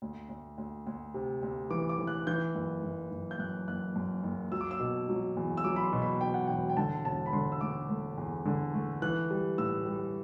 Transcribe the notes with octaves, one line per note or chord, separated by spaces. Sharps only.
D2
D2
D2
D2
C3
D2
E3 D6
D6
E3
F#6
E3 G6
F#1
F#1
F#1
G6
F#2 F#6
F#1 F#6
F#2
F#1
F#3 E6
D6
E6
B2
F#3
E2
E6
F#3 D6
B5
C6
B2
B5
B2 G5
F#5
E1 G5
G5
D3 A5
E1 A5
B5
D3 C6
E6
A3 D6
A3
E2
D3
A3
E3 F#6
G3
A2 E6
G3